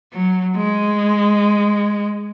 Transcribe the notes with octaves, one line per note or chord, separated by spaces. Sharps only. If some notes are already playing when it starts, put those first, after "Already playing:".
F#3
G#3